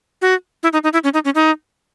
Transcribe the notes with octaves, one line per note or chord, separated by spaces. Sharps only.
F#4
E4
D#4
D#4
E4
C#4
D#4
C#4
D#4